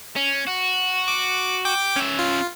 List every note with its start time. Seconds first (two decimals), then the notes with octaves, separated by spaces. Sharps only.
0.16 C#4
0.48 F#4
1.08 D6
1.65 G5 D6
1.96 C#4 E5
2.19 F4